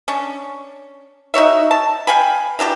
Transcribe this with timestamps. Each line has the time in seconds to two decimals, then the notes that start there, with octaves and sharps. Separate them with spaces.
0.08 C#4 D4
1.34 D#4 F#4 C#5 E5
1.71 A5
2.07 F5 G5 G#5 B5
2.59 E3 F#3 D4 G4